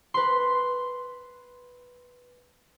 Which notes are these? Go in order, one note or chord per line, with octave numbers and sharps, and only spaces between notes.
B4 C6